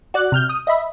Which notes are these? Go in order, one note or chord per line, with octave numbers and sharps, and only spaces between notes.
F#4 D5 F#6
C3 F6 G6
D#6
D#5 E5 B5